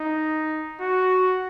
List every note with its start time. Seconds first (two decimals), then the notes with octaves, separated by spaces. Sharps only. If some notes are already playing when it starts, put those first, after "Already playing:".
Already playing: D#4
0.81 F#4